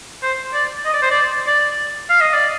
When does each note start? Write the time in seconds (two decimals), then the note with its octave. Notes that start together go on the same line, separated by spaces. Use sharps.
0.23 C5
0.54 D5
0.85 D#5
0.94 D5
1.02 C5
1.11 D5
1.47 D5
2.10 F5
2.21 D#5
2.34 D5